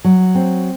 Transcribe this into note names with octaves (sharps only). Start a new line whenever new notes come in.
F#3
C4